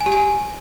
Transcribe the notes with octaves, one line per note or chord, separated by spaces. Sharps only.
G#5
G4
G#5